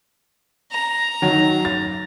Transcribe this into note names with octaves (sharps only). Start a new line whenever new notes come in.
A#5
D#3 F#3
A6